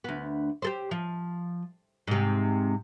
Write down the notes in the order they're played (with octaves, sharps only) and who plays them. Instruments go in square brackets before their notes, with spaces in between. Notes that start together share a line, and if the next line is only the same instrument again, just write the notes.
[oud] D2 B3
G4 A4 C5
F3
G#2 C3